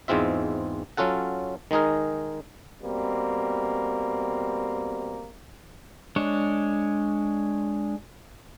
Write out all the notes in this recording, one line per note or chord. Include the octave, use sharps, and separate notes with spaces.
E2 G#2 G#3 C4 F4 E5
F#3 C#4 F4 A4 F#5
D#3 G#3 D#4 G#4 A#4
B2 G3 A#3 C4
G#3 D4 C#5